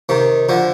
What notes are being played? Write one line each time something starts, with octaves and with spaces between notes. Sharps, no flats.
C3 D#3
D3 F3